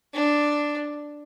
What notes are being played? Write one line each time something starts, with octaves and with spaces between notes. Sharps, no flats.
D4